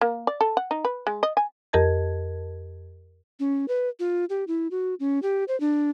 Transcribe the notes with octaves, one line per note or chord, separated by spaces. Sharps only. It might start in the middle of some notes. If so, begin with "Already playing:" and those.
A#3
D5
A4
F#5
D#4
B4
G#3
D#5
G#5
F2 G4 A#4 D#5 A5 G#6
C#4
B4
F4
G4
E4
F#4
C#4
G4
C5
D4